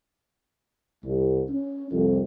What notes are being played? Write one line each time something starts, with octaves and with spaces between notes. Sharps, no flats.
C2
C#4
C2 F2